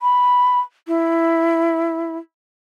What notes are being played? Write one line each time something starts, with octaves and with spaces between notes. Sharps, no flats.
B5
E4